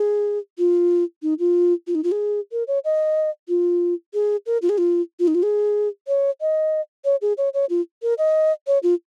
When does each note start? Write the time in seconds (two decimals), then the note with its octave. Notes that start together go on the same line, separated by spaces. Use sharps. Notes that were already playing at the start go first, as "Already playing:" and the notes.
Already playing: G#4
0.58 F4
1.23 D#4
1.39 F4
1.87 F4
1.95 D#4
2.04 F4
2.12 G#4
2.52 A#4
2.68 C#5
2.85 D#5
3.49 F4
4.14 G#4
4.46 A#4
4.62 F4
4.69 G#4
4.78 F4
5.19 F4
5.28 D#4
5.35 F4
5.43 G#4
6.08 C#5
6.41 D#5
7.05 C#5
7.22 G#4
7.38 C#5
7.54 C#5
7.70 F4
8.03 A#4
8.18 D#5
8.67 C#5
8.83 F4